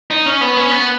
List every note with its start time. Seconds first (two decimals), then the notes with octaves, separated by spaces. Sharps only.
0.11 D#4
0.26 C#4
0.41 B3
0.57 C#4
0.71 B3